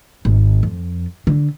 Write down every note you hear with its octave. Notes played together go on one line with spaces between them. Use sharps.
G#1
F2
D3